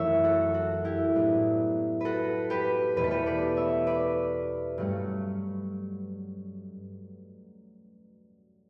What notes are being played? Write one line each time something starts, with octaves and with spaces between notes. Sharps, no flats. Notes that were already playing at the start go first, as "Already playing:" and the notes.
Already playing: F#2 E3 A3 C#5 E5
F#4 A4
F#4
E4 G4
A2 F#3 B3 D4
F#4 A4 B4
G4 B4
E2 B2 A3 B4
A4
G4 B4
B4 D5
C#5 E5
B4 D5
G2 F#3 A3 C#4